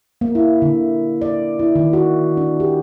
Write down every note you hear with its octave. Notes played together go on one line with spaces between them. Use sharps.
A#3
E4
D3
D5
E4
D#3
F#4
D4
G4